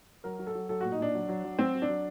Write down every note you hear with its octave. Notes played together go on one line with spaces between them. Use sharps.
F#3 A#4
F#3
A4
F#3
F#3 A4
A#2 F#4
D#4
A#2 D4
F#3
F#3
F#3
F#3 C4
F#3
D4
F#3